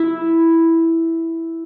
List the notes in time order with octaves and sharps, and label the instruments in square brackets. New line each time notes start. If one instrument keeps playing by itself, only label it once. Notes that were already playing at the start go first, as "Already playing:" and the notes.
Already playing: [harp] E4